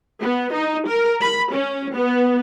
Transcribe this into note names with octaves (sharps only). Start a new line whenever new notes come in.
B3
D#4
A#4
B5
C#4
B3